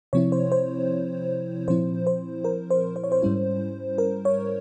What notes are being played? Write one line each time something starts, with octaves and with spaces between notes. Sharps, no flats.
C3 F3 C4 E4 C#5
C5
C5
A#2 F3 C4 E4 C5
C5
A#4
C5
C5
C#5
C5
G#2 G3 C#4 E4
A#4
C#5